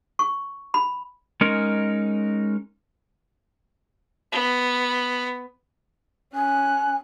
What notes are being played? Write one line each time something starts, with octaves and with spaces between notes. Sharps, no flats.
C#6
B5
G#3 C#4 D#4 A#4
B3
C#4 G#5 F#6